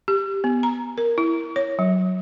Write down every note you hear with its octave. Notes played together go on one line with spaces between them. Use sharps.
G4
B3
A#5
A#4
E4
C#5
F#3